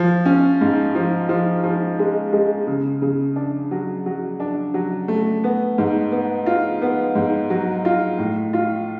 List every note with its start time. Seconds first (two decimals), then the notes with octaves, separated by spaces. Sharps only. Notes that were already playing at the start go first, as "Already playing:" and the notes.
Already playing: F3
0.26 C#4
0.61 G#2
0.95 F3
1.29 F3
1.63 F3
1.99 G#3
2.33 G#3
2.67 C#3
3.02 C#3
3.36 D4
3.71 F#3
4.06 F#3
4.40 D4
4.74 F#3
5.08 A3
5.44 B3
5.78 G#2
6.12 B3
6.46 F4
6.82 B3
7.15 G#2
7.50 F#3
7.85 F4
8.19 A2
8.53 F4